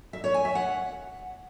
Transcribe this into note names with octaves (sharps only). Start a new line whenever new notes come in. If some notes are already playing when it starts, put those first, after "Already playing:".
E5
C#5
G#5
E5
F#5